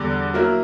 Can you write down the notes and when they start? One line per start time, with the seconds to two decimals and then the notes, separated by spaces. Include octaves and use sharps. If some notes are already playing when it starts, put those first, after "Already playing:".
Already playing: E2 D3 G3
0.34 F#3 A#3 E4 A#4